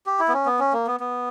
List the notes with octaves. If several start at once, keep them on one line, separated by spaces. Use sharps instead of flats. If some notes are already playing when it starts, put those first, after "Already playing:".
G4
E4
B3
C#4
B3
C#4
A#3
B3
B3